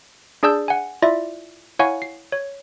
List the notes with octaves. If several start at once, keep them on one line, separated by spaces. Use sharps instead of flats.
D4 G#4 D5 A5 E6 G6
F#5 G#5
E4 F4 D5 E5 A#6
E4 C#5 F5 F#5 G#5 C#6
C7
C#5